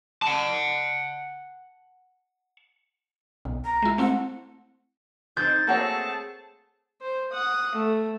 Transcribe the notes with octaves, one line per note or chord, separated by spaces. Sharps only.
F#5 A5
B1
A#5
G#3 E4
A3 C4 E4 F#5
C4 D#4 G6 A6
A3 A#3 C4 F#4 G#4 C#5 A5
C5
F#5 D#6
A3